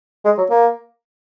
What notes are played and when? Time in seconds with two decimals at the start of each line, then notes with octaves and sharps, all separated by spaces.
0.24 G#3
0.37 F#3
0.50 A#3